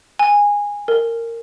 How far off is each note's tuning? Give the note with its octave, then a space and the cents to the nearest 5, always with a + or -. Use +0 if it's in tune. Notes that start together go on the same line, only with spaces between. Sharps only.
G#5 -15
A#4 -15